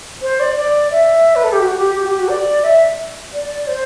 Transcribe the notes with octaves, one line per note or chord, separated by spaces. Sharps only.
C5
D5
D5
E5
B4
A4
G4
F#4
G4
G4
F#4
G4
F#4
D5
E5
D5
C5